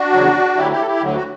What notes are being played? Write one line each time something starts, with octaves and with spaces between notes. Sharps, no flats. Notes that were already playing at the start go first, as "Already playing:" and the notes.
Already playing: D4 F#4
E2 C#3 F#3
D2 D3 F#3 E4 G4
E4 G4
A4
E4 G4
D2 D3 F#3
F#4